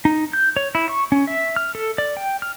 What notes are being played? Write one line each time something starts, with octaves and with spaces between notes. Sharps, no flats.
D#4
G6
C#5
E4
C#6
C#4
E5
F6
A4
D5
G5
F6